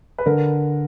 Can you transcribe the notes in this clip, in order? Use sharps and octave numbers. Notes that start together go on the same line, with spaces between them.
B4
D3 A#4